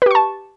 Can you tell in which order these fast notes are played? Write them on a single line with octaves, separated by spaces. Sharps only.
B4 G4 C#6 A5